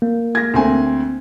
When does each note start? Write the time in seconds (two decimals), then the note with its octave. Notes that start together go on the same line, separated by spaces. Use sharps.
0.02 A#3
0.35 G#6 A#6
0.54 D2 C4 G#5